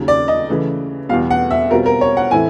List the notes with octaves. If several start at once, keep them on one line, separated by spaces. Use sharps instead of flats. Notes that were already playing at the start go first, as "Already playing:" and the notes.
Already playing: D#2 C#3 F#3
D5
D#5
C#3 E3 A3
E2 B2 G3 B3 F5
F#5
E5
B2 G3 C4 F4 A#4
A#4
C#5
F#5
A2 E3 A3 C4 E4 G#5